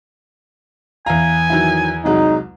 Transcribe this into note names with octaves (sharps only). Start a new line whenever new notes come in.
E2 F5 G#5 A#5
D#3 F#3 E4
C2 F#3 G#3 D#4